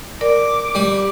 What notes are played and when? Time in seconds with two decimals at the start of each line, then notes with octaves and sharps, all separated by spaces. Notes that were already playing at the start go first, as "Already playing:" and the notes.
0.21 A#4 D5 D6
0.75 G3